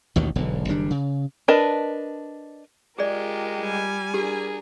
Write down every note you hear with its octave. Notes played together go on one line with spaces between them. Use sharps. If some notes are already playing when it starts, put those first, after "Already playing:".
A1 D#2 B2 D#3
E1 B1 D3
F#1 D#3 G3 D4
C#3
D4 A#4 B4 D#5 A5
G#3 F4 G4 G#4 A#4 D5
G3 G#5
D4 G4 G#4 A#4